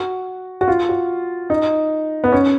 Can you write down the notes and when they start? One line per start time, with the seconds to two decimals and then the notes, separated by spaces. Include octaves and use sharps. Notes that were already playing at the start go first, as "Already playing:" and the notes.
Already playing: F#4
0.61 F#4
0.68 F4
0.89 F#4
1.50 D#4
2.24 B3
2.32 C#4